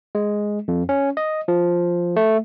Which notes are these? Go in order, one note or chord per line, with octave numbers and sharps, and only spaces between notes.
G#3
F2
C#4
D#5
F3
A3